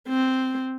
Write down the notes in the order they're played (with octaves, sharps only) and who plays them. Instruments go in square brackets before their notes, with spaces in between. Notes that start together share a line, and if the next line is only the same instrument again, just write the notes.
[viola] C4